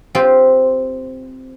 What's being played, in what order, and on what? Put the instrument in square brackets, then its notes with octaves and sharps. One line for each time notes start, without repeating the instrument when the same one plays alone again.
[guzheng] C4 F4 G4 C5